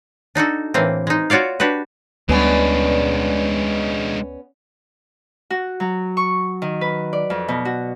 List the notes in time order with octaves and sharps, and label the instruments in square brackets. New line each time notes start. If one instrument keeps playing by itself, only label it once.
[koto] D4 D#4 F#4 A4
A2 E3 A#3 C4
G#3 D#4
F4 F#4 C#5 D5 F5
D4 F#4 G4 B4
[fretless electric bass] D2 G3 [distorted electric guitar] G#3 D4 [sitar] B3 C#4 D5
[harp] F#4
F#3
C#6
D#3
B4
D5
F2
B2
F#4